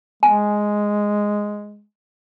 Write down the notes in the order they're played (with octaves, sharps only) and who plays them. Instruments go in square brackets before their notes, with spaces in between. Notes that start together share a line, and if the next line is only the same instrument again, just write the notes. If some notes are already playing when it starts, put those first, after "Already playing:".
[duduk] G#3 [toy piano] G#5